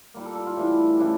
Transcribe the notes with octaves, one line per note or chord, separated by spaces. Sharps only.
A#2 G3 A#3
A4
A4
F4
A2 E3 G3 D4 G4
C#3 E3 A3 D4